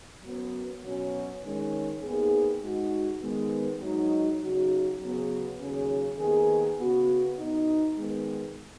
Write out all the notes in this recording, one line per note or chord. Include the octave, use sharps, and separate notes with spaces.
F#2 F#3 B3
B2 F#3 C#4
D#3 G#3 C#4
D#2 D#3 B3 G#4
G#2 G#3 D#4 F#4
D#3 G#3 B3
G#2 F#3 D#4
C#3 F#3 D#4 F#4
C#3 F#3 B3 G#4
D#2 C#3 F#3 C#4 G#4
D#2 D#3 B3 G#4
C#3 B3 F#4
B2 B3 D#4
D#3 G#3 B3